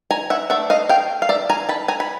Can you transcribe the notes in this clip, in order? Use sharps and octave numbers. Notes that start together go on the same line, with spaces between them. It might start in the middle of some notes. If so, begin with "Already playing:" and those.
G#5 A#5
E5 F#5
A3 D4 E5 F#5
D#5 F5
F5 G5
F5
D5 E5
G#5 A#5
A5 B5
G#5 A#5
B5